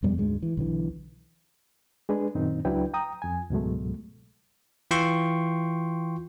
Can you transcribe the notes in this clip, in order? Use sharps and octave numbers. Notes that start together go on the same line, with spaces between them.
F2 B2 G3 G#3
D2 G#2 G#3
E3
B1 D3 E3
G#3 D4 G#4 B4
F#2 A#2 D#3 C4 D#4
C#2 F#3 D4 E4 B4 G5
G5 A#5 D#6
F2 G#5
C#2 G#2 B2 F#3 G#3 A3
E3 F4 G5 C6 C#6